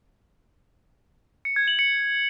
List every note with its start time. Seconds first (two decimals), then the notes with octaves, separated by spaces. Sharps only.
1.45 C#7
1.56 G#6
1.68 F#7
1.79 C#7